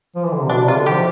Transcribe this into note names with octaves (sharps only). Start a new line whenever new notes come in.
F3
E3
D3
C3
B2 D4
C3 F4
D3
F3 G4